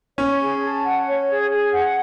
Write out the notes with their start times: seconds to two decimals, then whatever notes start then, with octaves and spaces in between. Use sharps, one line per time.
0.18 C#4 C#5
0.40 G#4
0.62 A5
0.84 F#5
1.07 C#5
1.29 G#4
1.51 G#4
1.73 F#5